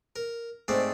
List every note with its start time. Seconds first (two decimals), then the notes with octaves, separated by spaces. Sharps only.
0.16 A#4
0.68 G#2 A3 C4 D5